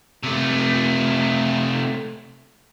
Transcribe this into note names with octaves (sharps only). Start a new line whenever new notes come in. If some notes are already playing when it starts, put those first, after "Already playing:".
C3 A3